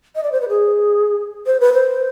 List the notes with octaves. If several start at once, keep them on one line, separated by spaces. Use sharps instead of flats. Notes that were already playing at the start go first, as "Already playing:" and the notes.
D#5
D5
C5
B4
G#4
C5
B4
C5